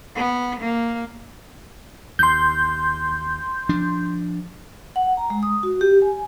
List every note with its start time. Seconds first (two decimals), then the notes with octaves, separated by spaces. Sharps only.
0.15 B3
0.60 A#3
2.19 D#2 C6 G6
3.69 F3 D4
4.96 F#5
5.17 A#5
5.30 G#3
5.43 D#6
5.63 F#4
5.81 G4
6.02 G#5